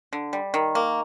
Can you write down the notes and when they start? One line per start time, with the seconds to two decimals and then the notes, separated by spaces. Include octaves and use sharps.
0.13 D3
0.33 G3
0.54 D#3
0.75 A#3